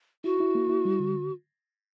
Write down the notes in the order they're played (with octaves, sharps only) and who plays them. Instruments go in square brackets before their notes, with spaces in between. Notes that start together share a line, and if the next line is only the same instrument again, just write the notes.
[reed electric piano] E4 [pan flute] F#4
[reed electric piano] E4
A#3
E4
G3
D3